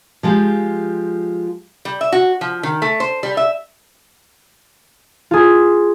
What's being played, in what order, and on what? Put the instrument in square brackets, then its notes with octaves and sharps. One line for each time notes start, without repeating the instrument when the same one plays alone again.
[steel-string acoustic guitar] F3 G#3 F4 G4
[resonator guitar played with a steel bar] G3
E5
F#4
F3
D#3
A3
C5
G3
E5
[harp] F4 G#4